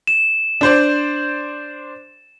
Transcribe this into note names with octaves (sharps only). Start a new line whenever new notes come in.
E7
D4 C5 D5